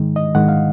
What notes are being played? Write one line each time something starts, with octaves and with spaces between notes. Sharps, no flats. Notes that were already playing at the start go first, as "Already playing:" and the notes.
Already playing: G#2 D#3 G#3
D#5
G#2 D#3 G#3 F#5
F5